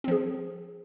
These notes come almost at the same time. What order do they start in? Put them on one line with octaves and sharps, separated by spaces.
C4 F3 G#4